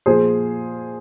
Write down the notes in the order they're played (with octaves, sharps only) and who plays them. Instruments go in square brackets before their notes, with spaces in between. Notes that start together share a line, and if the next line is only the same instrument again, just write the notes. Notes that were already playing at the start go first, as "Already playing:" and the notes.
[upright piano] A#2 F3 G#4 C5